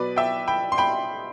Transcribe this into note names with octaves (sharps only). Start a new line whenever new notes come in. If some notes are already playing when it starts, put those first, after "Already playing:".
Already playing: B2 F#3 B4 D5
E5 G5
G5 B5
C6
G5 B5